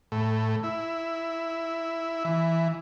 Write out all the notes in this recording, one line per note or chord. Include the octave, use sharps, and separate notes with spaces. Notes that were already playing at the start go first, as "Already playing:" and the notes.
A2
E4
E3